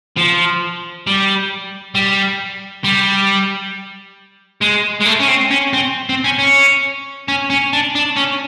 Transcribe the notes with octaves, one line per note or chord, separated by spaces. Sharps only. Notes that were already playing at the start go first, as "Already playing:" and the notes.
F3
G3
G3
G3
G#3
G#3
A3
C#4
C4
C#4
C4
C4
C#4
C#4
C#4
C#4
D4
D4
C#4